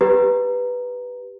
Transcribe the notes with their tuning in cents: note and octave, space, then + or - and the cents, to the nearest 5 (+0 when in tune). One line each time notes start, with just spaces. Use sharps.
G4 +0 B4 +0 A#5 +0